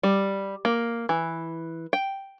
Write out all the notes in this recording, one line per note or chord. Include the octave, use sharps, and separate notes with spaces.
G3
A#3
E3
G5